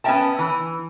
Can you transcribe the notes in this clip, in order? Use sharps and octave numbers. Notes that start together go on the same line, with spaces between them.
B3 C#4 A4 E5 G5 A5
E3